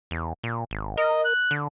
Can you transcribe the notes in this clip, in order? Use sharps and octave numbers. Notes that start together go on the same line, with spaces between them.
E2
A#2
G#1
A#4 D#5
F#6
D3